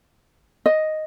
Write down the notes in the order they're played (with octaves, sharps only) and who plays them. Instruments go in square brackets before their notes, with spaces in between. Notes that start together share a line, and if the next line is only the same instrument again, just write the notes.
[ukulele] D#5